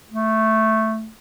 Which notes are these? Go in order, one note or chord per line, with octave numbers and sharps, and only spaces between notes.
A3